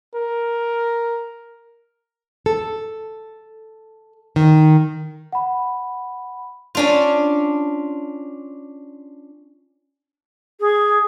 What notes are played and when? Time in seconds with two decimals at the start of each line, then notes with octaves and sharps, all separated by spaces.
0.15 A#4
2.46 A4
4.36 D#3
5.33 F#5 B5
6.75 C#4 D4 F4
10.60 G#4